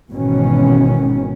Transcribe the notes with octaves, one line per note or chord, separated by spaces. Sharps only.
G#1 B2 D#3 E3 C#4